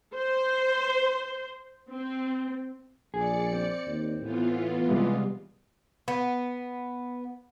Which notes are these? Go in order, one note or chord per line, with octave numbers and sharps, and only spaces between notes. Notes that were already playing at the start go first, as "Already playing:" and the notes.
C5
C4
A#1 G#4 D5 C#7
C4
D#2
A2 E3 B3 F4
C3 G3 G#3
B3